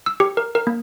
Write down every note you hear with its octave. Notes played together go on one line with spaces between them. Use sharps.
E6
G4
A#4
A#4
A#3